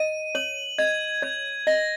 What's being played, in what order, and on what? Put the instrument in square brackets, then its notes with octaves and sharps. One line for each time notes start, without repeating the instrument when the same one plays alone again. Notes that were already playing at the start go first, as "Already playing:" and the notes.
Already playing: [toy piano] D#5 [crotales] D#7
[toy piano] C#5 [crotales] F#7
[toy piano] D#5 [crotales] G#6
[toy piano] C#5 [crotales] G#6
[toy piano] D#5 [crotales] A#6